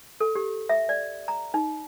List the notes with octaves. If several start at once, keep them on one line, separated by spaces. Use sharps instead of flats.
A4
G4
E5
D5
A#5
D#4